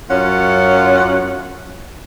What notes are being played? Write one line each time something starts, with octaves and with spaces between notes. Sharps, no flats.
F#2 C#4 F4 F#5